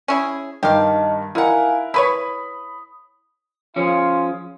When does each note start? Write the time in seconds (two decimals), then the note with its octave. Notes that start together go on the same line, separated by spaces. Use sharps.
0.08 C#4 E4 G#4
0.63 G2 D#3 G4 D#5 F5 A5
1.35 D#4 E4 A#4 F5 F#5 G#5
1.94 E4 B4 C#5 B5 D#6
3.76 F3 C#4 F4 G#4 F5